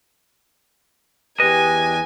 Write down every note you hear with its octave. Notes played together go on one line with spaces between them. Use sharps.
E2 G4 B4 D#5 G#5